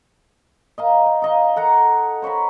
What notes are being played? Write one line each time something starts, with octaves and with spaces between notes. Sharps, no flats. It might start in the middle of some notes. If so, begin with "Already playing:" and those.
D#5 F5 A#5
G5
D#4 D#5 F5
A4 F#5 A#5
C5 C#5 A#5 B5